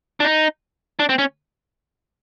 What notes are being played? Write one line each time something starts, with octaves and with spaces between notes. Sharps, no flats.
D4
D#4
D4
C4
C#4